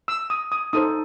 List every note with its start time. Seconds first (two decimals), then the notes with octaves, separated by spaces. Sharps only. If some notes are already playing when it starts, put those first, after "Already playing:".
0.08 E6
0.30 D#6
0.52 D#6
0.73 D#4 A4 C5 D#6